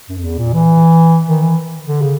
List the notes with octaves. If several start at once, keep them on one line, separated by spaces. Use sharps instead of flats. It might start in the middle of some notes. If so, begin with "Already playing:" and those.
F#2
F2
E2
A#2
E3
D#3
E3
D3
C#3